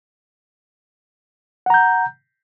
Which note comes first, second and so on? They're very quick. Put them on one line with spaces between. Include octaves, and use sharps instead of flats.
F#5 A#5 G6